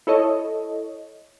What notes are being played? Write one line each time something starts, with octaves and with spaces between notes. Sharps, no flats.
E4 A4 C#5 D#5